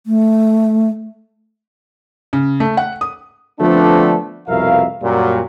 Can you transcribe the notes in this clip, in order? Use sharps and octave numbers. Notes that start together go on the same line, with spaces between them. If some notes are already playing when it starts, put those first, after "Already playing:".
A3
C#3
A3
F#5
D#6
D3 F3 A3 B3 C4 D4
C2 F2 B2 A#4 E5 F5
F#2 A#2 F#3 G3